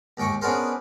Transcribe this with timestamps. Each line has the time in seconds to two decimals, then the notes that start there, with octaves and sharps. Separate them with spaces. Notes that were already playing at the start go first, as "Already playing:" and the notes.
0.17 D#2 G#2 G5 C#6 D6
0.41 B3 C#4 D4 G#4 A#4 C5